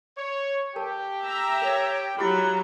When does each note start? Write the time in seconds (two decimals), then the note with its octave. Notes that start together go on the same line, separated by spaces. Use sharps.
0.18 C#5
0.76 G4 A#4 G5 A5
1.25 E5 A#5
1.62 A#4 C#5
2.18 F#3 G#3 E4 G4 G#4 F5 A#5 B5